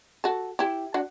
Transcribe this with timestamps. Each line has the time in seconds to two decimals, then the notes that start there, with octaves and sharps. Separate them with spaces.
0.24 F#4 A4
0.59 E4 G4
0.94 D4 F#4